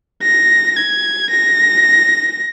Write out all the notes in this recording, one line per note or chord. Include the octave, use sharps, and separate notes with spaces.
A#6
G#6
A#6